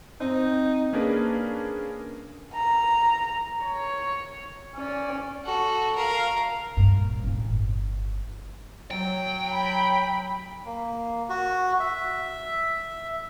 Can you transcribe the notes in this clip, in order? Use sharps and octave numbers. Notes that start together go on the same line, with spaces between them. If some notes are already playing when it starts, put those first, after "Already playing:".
C4 D#4
A#3 C#4 D4 G#4 A#4 B4
A#5
C#5
C#4 D5
F#4 A4
A#4 F5
G2 A#2
A2 C#4
G1
F#3 G5
B5
A#3
F#4
E5